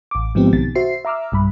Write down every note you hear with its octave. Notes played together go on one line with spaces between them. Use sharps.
A1 D6
G#2 F3 B3 C4 G4
B1 B2 D#3 A6
F#4 C5 E5 C7
E5 A#5 D6 E6 F6
B1 G2 B5